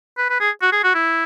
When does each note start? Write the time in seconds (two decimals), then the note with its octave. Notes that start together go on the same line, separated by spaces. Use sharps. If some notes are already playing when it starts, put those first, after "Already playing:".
0.18 B4
0.30 B4
0.40 G#4
0.62 F#4
0.72 G#4
0.84 F#4
0.94 E4